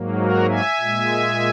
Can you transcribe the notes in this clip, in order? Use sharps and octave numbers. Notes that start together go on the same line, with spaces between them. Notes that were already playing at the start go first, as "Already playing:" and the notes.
Already playing: G#2 F#3 A#3
F#4 A#4
E5 G#5
A#2 G#3